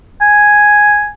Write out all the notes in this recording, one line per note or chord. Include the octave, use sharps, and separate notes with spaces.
G#5